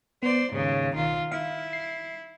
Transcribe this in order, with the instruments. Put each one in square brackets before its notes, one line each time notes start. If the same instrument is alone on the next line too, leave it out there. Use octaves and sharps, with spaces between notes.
[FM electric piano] B3 [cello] C5 D5
[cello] D#2 C#3 [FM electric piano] G#2
[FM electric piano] B1 [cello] D#3 F4
[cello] E4 [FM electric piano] F5
[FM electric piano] C7